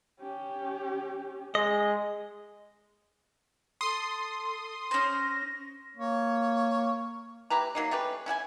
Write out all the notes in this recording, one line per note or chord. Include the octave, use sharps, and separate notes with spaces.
C#4 G4
G#3 D#5
A4 C6 D#6
C#4 C5 A#6
A#3 C#5
E4 G4 B4 A#5
F#3 A#3 D#4
A3 C#4 G4 B4
C#4 E4 F#5 G#5